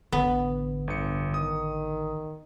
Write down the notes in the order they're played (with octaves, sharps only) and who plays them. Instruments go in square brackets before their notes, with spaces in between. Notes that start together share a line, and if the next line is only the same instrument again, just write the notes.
[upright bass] A1 D3 [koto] B3
[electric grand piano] G1 C#7
[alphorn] D#3 [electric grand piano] D#6